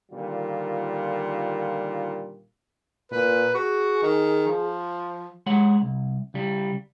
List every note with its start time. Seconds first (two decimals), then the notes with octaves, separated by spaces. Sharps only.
0.11 A#2 D3 D#3 G3 F4
3.12 A#2 B4
3.54 F#4 G#4
4.02 D#3
4.48 F3
5.46 G#3 C#5 F#5
5.82 C2
6.34 C#3 G3